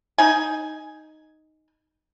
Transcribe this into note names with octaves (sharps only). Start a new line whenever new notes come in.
D#4 G#5